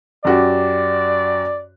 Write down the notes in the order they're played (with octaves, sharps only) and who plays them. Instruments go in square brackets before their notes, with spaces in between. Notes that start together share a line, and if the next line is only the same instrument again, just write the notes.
[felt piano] F#2 F#4 G4 [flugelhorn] D5